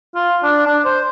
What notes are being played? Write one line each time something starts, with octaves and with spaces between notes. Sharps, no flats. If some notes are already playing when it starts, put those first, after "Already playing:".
F4
D4
D4
C5